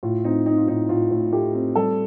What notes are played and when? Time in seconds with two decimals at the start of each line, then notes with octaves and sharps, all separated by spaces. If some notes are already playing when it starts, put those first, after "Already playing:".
0.03 A2 F4
0.24 C4 D#4
0.46 C4 D#4
0.58 F4
0.67 A2 D#4
0.89 A2 F4
1.11 A2
1.32 A3 G4
1.54 C4
1.76 G3 A4